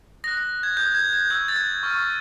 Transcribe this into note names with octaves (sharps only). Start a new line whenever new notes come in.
D#6 F#6 A#6
A#6
G#6
D#6 F#6 G6
G#6
G#6
C#6 E6 G6
A6
G#6
C#6 F6